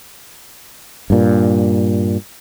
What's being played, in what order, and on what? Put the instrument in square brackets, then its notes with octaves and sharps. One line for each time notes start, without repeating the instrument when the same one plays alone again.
[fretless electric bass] G2 A#2